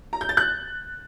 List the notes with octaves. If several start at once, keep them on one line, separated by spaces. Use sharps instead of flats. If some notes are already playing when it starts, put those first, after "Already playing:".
A#5
G6
A6
F#6